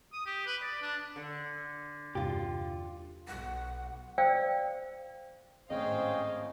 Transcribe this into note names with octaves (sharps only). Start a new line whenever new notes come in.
D#6
G4
B4
D5
D4
D3
E2 G2 C3 F4 G4
B1 F#5
C5 D5 F5 G5 E6
G#1 A2 C#4 G#4 C5 D#5 F5 G5